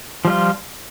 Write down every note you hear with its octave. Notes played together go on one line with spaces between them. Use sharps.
F3 G3 F4